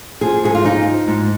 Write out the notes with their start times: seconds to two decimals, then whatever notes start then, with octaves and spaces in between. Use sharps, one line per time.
0.21 F3 G#4
0.44 G#2 G#4
0.55 F4
0.65 F3 D#4
0.87 F3
1.08 G#2